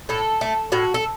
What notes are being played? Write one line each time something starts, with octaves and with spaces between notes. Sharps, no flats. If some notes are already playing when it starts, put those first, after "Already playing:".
A2 A4
A3
A2 F#4
A4